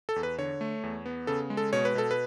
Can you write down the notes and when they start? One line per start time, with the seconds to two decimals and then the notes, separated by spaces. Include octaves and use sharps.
0.09 A4
0.16 E2
0.23 B4
0.38 D3 C#5
0.61 A3
0.83 E2
1.06 B3
1.27 C#3 A4
1.50 G#3
1.57 A4
1.73 B2 C#5
1.85 B4
1.95 B2 A4
2.11 B4